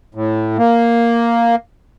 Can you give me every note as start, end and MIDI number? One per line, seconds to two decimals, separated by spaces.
0.15 0.57 45
0.58 1.56 58